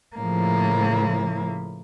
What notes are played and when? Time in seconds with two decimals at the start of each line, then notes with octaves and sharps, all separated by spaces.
0.17 A2 C#3 F3 A#3 E4